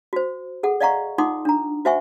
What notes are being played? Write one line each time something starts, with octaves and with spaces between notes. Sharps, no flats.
F#4 C5
G#4 A4 F#5
D5 D#5 F5 F#5 A#5 C#6
D#4 F4 F#5 C6 D6 D#6
D4 A#5
F#4 C5 E5 F#5 G#5 C#6